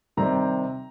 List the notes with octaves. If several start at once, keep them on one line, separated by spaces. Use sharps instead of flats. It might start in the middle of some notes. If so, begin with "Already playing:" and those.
C3 D#3 G3 C4 A#5